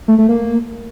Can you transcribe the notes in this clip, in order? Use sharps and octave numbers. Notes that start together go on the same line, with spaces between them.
A3
A3
A#3